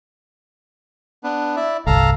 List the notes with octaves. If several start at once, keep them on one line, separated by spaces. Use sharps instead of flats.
B3 D4 B4
E4 D5 E5
G1 C2 A4 F5 A#5